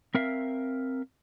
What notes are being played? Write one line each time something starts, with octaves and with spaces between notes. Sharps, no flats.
C4 A#4 E5 F5